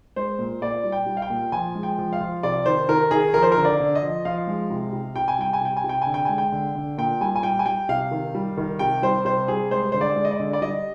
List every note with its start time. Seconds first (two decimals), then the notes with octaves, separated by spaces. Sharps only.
0.16 G#3 C5
0.39 A#2
0.62 A#2 D5
0.84 G3
0.92 G5
1.06 G3
1.17 F5
1.22 G5
1.30 A#2
1.52 F3 G#5
1.75 G#3
1.83 G5
1.98 F3
2.13 F5
2.20 F3
2.43 C3 D5
2.66 D#3 C5
2.89 D#3 A#4
3.11 D#3 G#4
3.34 F3 A#4
3.43 C5
3.52 D3 A#4
3.65 D5
3.80 D3
3.95 D#5
4.03 F3
4.25 F3 F5
4.47 G#3
4.70 C3
4.93 C3
5.16 C3 G5
5.28 G#5
5.39 G3 G5
5.53 G#5
5.61 C3 G5
5.77 G#5
5.84 C3
5.89 G5
6.02 D3 G#5
6.14 G5
6.25 G#3 G#5
6.38 G5
6.52 D3
6.75 D3
6.98 A#2 G5
7.21 G3 G#5
7.36 G#5
7.43 G3 G5
7.59 G#5
7.66 G3 G5
7.89 C3 F5
8.11 D#3
8.35 G3
8.57 D#3
8.79 C3 G5
9.02 G3 C5
9.25 C3 C5
9.48 G3 G#4
9.71 G#3 C5
9.92 D3 C5
10.01 D5
10.16 G#3
10.25 D#5
10.31 D5
10.40 D3
10.53 D5
10.62 G3 D#5